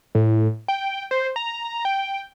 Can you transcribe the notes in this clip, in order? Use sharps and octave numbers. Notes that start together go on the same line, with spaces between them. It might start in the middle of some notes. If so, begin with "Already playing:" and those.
A2
G5
C5
A#5
G5